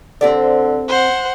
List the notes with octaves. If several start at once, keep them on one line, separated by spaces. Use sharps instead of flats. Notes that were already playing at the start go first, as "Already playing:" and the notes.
D3 C4 G4 D5
C5 F#5